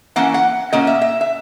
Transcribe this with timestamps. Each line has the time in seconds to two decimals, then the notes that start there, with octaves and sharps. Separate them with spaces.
0.16 E3 A#3 C#4 F#5
0.34 F#5
0.73 A#2 A#3 C#4 D#5
0.87 E5
1.01 E5
1.21 E5